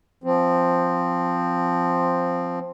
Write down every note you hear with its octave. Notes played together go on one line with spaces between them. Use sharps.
F3 C4